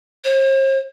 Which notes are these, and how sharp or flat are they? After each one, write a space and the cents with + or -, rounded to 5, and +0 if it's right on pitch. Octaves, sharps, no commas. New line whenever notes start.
C5 +45